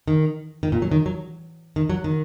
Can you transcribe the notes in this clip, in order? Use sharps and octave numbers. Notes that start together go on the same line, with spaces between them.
D#3
D#3
A#2
F#3
D#3
F#3
D#3
F#3
D#3